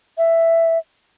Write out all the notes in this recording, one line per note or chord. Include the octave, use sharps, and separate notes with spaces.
E5